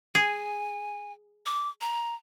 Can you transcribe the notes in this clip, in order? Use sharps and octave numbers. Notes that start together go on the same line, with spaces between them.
G#4 G#5
D6
A#5